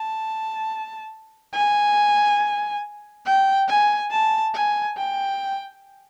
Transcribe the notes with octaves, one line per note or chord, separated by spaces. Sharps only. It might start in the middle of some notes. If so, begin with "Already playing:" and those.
Already playing: A5
G#5
G5
G#5
A5
G#5
G5